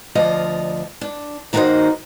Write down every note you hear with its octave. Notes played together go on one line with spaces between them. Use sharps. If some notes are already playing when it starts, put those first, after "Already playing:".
D2 F3 D5 D#5 F5
D4
D#3 A#3 D#4 F#4 C5 D#5